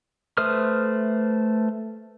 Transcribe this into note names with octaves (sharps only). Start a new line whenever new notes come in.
A3 B4 C5 D#6 F6